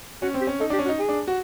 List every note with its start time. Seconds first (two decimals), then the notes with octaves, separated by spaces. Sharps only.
0.22 C#4 F#4
0.34 C4
0.41 G4
0.47 C#4
0.60 D#4 A4
0.70 D4 G4
0.79 C#4
0.85 F#4
0.89 D#4
0.99 G#4
1.09 D4
1.28 F#4